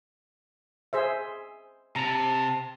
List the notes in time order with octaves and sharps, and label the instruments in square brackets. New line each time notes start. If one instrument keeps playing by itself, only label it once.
[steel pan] G#4 C5 E5
[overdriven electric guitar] C3 [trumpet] A5 [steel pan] A#5